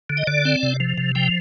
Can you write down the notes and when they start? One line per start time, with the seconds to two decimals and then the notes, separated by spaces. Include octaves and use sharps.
0.10 D3
0.17 D#5
0.27 D3 D5
0.45 C4
0.63 C3
0.80 F3
0.98 C3
1.15 F3 G5